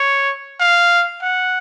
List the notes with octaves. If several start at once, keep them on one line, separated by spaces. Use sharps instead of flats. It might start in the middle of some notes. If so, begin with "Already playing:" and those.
Already playing: C#5
F5
F#5